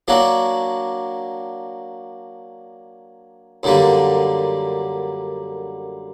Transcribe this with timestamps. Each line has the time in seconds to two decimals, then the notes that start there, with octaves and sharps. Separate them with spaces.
0.08 F#3 A#3 D4 F#4
3.63 F#2 D3 G3 A#3